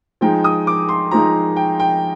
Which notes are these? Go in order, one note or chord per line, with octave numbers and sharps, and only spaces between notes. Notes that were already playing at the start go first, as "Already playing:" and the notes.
F3 G#3 D#4 G5
D#6
D6
C6
F3 G#3 D#4 A#5
G5
G5